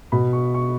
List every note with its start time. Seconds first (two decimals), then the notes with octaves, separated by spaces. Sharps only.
0.12 B2 B3 B5
0.33 C#6
0.54 C#6